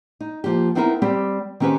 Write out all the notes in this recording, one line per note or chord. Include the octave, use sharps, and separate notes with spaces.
D#4
F3 A#3 G4
B3 C4 D#4 E4 G4 A#4
G3 C4 G4
D#3 C4 C#4 G4 B4 C5